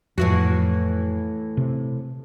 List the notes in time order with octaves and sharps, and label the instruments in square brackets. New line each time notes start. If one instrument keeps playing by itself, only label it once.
[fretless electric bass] F2 [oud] A2 E3 F#4
[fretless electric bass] C3